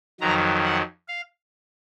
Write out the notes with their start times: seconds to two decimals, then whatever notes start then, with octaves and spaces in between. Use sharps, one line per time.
0.21 F2 D#3 F#3 A#5
0.64 F#5
1.08 F5